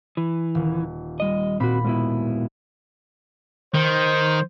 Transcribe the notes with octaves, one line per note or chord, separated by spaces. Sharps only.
E3
D#1
G3 D#5
A#2 C4 F#4 B5
G#2 B2 E4
D#3 C5